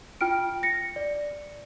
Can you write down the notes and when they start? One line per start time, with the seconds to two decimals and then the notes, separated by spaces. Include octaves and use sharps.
0.21 F4 G5 F6 D7
0.63 A#6 C#7
0.96 D5